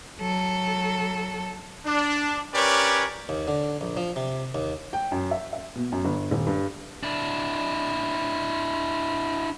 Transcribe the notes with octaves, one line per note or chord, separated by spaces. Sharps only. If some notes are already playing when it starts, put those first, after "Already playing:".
F#3 A4
D4
C#4 G4 A#4 B4 C#5 D5
D#2
D3
A#1
F3
C3
D#2
G5
F#2
E5
E5
B2
F#2
G1
D#1
G2
D4 E4